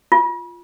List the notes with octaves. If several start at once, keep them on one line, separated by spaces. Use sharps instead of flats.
F4